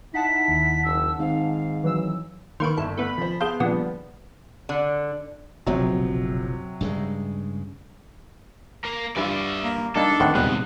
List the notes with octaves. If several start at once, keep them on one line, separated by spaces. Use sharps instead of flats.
D#4 E4 F#5 A5 B6
D#2
F#1 E6
G#2 D#3 C4 F5
E3 F#3 E6
D#3 A#3 B4 C6 C#6
G1 E4 A4
A3 B3 B5
F3 C5
B3 G#4 F5 A5 C6 G6
A#2 D3 F3 G3 B4 F#5 D#6
D3
F#1 B1 C3 F3 F#3
G2 C#3 G#3
A#3 A#4
G2 E3 F4 D5 E5
A#3
G3 A#3 D4 D#4 A4
A2 D#3 C4 F#5
A#1 D#2 C3 G3 G#3 B3 F#6